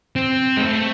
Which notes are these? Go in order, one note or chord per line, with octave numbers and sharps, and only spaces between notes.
C4
G#3
A3